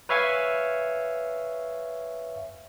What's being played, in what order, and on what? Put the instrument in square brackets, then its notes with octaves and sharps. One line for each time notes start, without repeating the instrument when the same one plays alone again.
[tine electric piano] B4 C#5 E5 F5 G#5 C#6